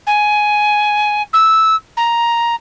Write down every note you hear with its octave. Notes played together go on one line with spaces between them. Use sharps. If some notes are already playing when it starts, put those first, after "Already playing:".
G#5
E6
A#5